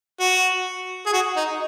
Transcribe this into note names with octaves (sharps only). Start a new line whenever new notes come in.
F#4
G#4
F#4
D#4